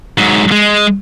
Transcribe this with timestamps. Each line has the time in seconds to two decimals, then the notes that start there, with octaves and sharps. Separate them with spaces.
0.18 G#2 F#3
0.52 G#3